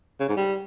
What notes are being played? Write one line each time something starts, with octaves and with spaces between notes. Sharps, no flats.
C#3
G#2
G3